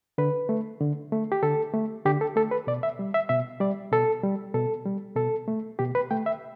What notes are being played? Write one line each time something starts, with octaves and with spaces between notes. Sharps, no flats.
D3 B4
A3
D3
A3
G4
D3 A4
A3
D3 G4
A4
A3 A4
B4
B2 D5
E5
G3
E5
B2 E5
G3 D5
B2 A4
G3
B2 A4
G3
B2 A4
A3
B2 G4
B4
A3 G5
E5